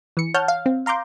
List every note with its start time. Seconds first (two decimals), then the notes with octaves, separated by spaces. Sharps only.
0.17 E3 C#7
0.34 C#5 F#5 A5 F6 G6
0.48 F5
0.66 C4
0.86 F5 A#5 C6 D6 G6